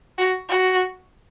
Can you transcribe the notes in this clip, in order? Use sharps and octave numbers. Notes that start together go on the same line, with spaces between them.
F#4
F#4